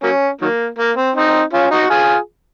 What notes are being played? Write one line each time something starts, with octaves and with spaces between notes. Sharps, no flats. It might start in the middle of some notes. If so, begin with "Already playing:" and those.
F#3 A#3 C#4
D#3 F#3 A#3
A#3
C4
C4 D#4
C#4 F4
D#4 F#4
F4 G#4